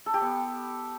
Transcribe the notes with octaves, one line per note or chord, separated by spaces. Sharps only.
A4
G4
B3